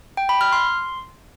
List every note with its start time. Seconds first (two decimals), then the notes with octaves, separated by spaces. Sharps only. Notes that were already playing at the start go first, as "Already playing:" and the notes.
0.17 G5
0.29 B5
0.41 F6
0.52 C6